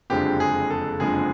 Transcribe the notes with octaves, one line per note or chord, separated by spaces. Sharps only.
F#1 F2 D3 F3 G#3 G4
G#4
A4
F#1 F2 D3 F3 G#3 G#4